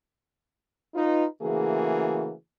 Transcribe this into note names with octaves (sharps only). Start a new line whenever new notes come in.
D#4 F4 B4
C#3 E3 A3 A#3 F#4 G#4